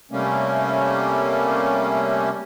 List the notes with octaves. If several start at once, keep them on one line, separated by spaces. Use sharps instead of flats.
C3 G3 A3 A#3 C#4